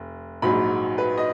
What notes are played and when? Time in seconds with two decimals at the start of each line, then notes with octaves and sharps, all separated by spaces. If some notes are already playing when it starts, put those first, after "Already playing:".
Already playing: F1
0.42 A#1 G#2 F#3 B5
0.98 B4
1.18 D#5